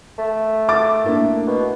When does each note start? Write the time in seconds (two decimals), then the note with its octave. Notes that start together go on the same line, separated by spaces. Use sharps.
0.18 A3
0.69 D6 A6
1.04 A2 A#3 D4
1.47 B2